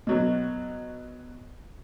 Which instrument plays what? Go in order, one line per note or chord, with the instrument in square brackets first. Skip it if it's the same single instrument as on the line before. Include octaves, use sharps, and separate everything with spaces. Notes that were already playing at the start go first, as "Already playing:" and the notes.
[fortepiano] B2 F#3